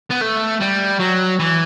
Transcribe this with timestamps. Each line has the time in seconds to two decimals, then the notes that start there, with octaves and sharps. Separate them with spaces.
0.11 B3
0.22 A3
0.61 G3
1.00 F#3
1.39 E3